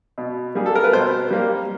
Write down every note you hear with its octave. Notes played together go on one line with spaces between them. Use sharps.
B2
G3 A#3 G#4
A4
A#4
B4
B2 C5
G3 A#3